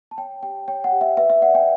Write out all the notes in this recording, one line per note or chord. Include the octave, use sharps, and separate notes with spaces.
A5
C#5 G5
G4 G5
C#5 G5
F#5
G4
E5
B4 E5
E5
D5 F#5
G5